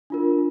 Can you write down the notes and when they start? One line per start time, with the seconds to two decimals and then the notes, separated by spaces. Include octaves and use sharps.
0.10 D4 F4 A#4